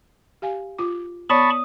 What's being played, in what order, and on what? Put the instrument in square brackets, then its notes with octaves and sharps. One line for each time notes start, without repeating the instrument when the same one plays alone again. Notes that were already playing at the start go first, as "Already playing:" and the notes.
[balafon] G4 F5 G#5
F4 D6
[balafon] B3 C#5 D5 [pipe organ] A5 B5 C#6 [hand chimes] D#6